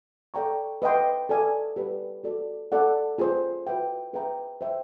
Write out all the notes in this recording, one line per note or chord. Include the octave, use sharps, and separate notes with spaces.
A4 D5 G5 A#5 C#6
B4 D#5 G5 C6
A4 D5 F5 G#5
G4 B4 D5
F#4 A4 D5
A4 D5 F#5
F4 G#4 C5
F#4 B4 E5 G5
G#4 B4 E5 G5 A#5
C5 E5 G5